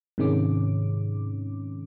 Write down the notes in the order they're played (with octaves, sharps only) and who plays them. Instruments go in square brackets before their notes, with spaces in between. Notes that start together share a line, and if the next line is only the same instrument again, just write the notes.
[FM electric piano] G#2 C3 D#3 G#3 C#4 D6